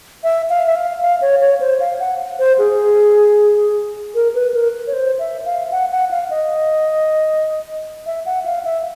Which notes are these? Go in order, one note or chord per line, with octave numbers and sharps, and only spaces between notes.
E5
F5
E5
F5
F5
C#5
C#5
C5
F5
F#5
C5
G#4
A#4
B4
A#4
C#5
C5
E5
F5
F#5
F#5
F5
D#5
E5
F#5
F5
E5